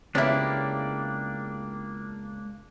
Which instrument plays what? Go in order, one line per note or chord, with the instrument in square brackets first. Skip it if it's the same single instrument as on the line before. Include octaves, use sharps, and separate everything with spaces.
[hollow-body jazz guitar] C#2 C#3 B3 [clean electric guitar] A#3 D4 [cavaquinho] E4 G4